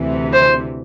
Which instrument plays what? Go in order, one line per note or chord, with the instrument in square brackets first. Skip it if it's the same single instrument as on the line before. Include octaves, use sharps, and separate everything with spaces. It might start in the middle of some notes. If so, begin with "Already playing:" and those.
Already playing: [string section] D2 C3 E3
[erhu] C5